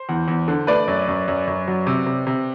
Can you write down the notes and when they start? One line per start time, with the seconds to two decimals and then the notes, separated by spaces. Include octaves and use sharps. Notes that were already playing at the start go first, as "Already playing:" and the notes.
Already playing: C5
0.09 E2
0.28 E2
0.48 D3
0.67 A3 B4 D5
0.87 F#2
1.08 F#2
1.28 F#2
1.47 F#2
1.68 F#3
1.87 C3
2.06 C3
2.27 C3